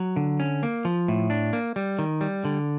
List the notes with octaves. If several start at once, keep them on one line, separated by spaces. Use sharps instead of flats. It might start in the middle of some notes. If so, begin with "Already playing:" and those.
Already playing: F#3
D3
C#4
A#3
F3
A2
D4
A#3
G3
D#3
G3
D3